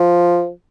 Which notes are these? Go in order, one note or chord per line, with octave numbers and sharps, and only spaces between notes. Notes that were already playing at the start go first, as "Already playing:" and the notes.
Already playing: F3